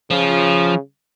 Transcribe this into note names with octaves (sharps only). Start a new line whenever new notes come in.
C#3 F3